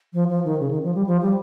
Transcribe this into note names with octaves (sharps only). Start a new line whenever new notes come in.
F3
F3
D#3
C#3
D#3
F3
G3
F3
G3